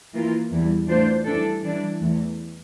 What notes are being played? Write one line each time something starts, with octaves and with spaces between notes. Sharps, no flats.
E3 A#3 F4
E2 E3 G3
E3 A3 D4 F4 C5
E3 G3 D4 A4
E3 G3 D4
E2 E3 A3